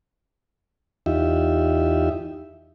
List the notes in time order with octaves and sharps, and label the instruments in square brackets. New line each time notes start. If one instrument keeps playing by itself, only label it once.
[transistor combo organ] E2 D#4 F4 G4 E5